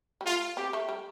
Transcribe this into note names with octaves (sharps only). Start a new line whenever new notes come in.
G3
A3 F4
C4 G4
A3
G3